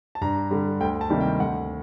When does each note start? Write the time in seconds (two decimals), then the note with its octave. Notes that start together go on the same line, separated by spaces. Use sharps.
0.15 A5
0.21 G2 A#5
0.51 D3 G3
0.81 D2 G5
1.01 A5
1.10 C3 D#3 G3 A#3
1.20 G5
1.40 D2 F#5